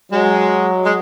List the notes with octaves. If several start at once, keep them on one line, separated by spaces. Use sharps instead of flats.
F#3 G#3
G#3